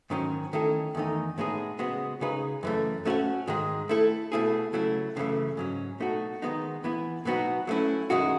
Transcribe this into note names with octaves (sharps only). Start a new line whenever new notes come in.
G#2 D#3 F#3 C#4
D#3 A3 C#4 E4 A4
E2 D#3 A3 D#4
A2 G#3 B3 D#4 G#4
C#3 G#3 B3 F#4
C#3 G#3 D#4 G#4 B4
F#2 E3 A3
A3 C#4 F#4 B4 E5
G#2 D#3 G#3
A3 E4 A4
B2 A3 E4 G#4
C#3 F#3 A3 E4
F#2 C#3 E3 A3
G#2 F#3 C#4
B2 A3 D#4 F#4
D#3 G#3 B3 D#4
E3 B3 E4
B2 F#3 B3 D#4 F#4
F#3 A3 C#4 E4
F#2 D#3 G#3 C#4 F#4